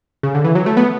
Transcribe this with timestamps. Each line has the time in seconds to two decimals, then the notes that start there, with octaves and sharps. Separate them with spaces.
0.23 C#3
0.35 D3
0.45 E3
0.55 F#3
0.66 A3
0.77 B3